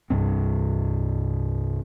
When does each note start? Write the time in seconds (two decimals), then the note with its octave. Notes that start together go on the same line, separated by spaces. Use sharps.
0.10 C2 G2 C4